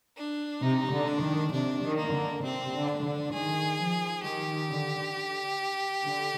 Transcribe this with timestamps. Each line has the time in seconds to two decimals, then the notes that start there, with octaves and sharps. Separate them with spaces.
0.17 D4
0.62 C3 D#4
0.92 D3
1.08 D4
1.22 D#3
1.52 C3 D4
1.83 D#3
1.97 A#3
2.13 D3
2.43 C3 C4
2.74 D3
2.88 D4
3.04 D3
3.33 D#3 G#4
3.78 F3
4.24 D#3 G4
4.69 D3
6.04 D3